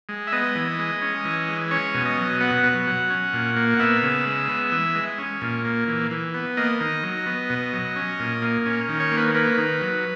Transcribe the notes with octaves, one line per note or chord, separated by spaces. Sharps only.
G#3
E5
B3 D#5
E3
G#3
C#4
E3
G#3
C#4 C#5
B2
D#5
F#3
B3 F#5
B2
F#3
C#4
A#2
A#3
F#5
B3 E5
C#3
G#3
B3
E3
G#3
C#4
A#2
A#3
E3
E3
B3
A#3 D#5
D#3
F#3
B3
B2
F#3
C#4
A#2
A#3
C#4
D#3
C#5
A#3
B4
A#3 B4
D#3
F#3